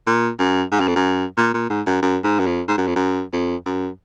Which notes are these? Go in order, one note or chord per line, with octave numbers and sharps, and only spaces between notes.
A#2
F#2
G#2
F#2
F2
F#2
A#2
A#2
G#2
F#2
F#2
G#2
F#2
F2
G#2
F#2
F2
F#2
F2
F#2